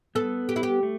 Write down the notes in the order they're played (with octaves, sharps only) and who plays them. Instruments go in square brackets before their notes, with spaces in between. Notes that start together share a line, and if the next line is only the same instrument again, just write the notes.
[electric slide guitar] B3 [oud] A4
[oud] G4
E4
G4
[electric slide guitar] A3